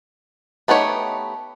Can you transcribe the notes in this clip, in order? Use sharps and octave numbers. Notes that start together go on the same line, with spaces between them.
A3 B3 D#4 G4 C#5